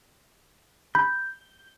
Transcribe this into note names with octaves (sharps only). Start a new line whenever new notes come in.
B5 G6